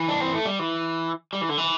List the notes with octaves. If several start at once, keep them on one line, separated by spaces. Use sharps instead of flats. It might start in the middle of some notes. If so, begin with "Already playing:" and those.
Already playing: E3
D4
C4
A3
G3
E3
G3
E3
D3
E3